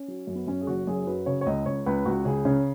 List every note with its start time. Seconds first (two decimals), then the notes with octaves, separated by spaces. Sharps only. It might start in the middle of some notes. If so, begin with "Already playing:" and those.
Already playing: C#4
0.08 F#3
0.27 F#2
0.35 B3
0.47 F#2 C#4
0.61 G#4
0.67 F#1 F#4
0.87 F#2 G#4
1.07 F#3 B4
1.26 C#3 C#5
1.41 C#5
1.46 C#2 D#5
1.66 C#2 C#5
1.86 C#2 B4
2.05 C#2 F#4
2.25 C#3 G#4
2.45 C#3 C#4